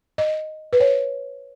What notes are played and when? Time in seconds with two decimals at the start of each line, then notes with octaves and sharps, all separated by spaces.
0.18 D#5
0.73 B4
0.80 C#5